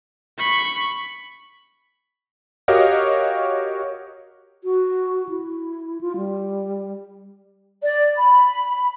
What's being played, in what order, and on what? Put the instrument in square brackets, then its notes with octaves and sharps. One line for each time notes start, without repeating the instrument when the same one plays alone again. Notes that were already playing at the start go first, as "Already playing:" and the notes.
[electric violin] B5 C#6
[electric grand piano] F#4 G4 A#4 C#5 D#5 F5
[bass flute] F#4
E4
F4
G3
[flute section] D5
B5